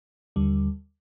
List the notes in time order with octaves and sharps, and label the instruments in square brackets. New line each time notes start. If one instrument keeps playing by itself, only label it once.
[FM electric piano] D#2 D3 G3